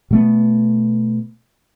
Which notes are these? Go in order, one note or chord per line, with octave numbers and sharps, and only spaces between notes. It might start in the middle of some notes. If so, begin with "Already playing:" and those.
B2 A3 B3